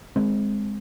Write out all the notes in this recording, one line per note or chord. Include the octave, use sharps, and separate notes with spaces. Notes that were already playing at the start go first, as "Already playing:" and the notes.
G#3 C4